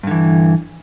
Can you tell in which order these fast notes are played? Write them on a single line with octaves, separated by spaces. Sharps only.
G2 D3 E3